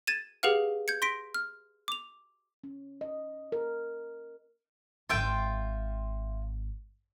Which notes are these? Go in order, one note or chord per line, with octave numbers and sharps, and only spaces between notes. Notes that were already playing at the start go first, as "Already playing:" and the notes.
G#6 A6 D#7 E7
G4 G#4 B4 F5 F#5 F6
G6 G#6 C#7
C6 A#6 B6 D7
F6
D6 F7
C#4
D#5
A#4
D#1 G#1 F4 E5 G5